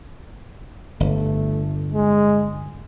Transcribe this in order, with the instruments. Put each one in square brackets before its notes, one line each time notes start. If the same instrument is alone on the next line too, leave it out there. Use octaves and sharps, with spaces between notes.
[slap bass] G1 [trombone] A3
[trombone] G#3